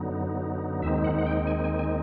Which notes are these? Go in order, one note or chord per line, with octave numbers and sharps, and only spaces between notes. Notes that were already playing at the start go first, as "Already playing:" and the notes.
Already playing: F#2 D3 F#3 B3 D#4
D#2 D#3 G#3 C4 D#4 E5
F#5
F#5
G5
G#5
G#5
G#5